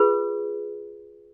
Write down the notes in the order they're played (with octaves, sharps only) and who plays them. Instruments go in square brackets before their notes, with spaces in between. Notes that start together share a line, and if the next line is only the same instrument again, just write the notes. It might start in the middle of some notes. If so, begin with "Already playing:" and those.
Already playing: [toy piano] F4 G#4 B4